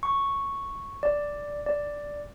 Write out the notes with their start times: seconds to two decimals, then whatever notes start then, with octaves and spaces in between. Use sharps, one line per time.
0.03 C#6
1.03 D5
1.66 D5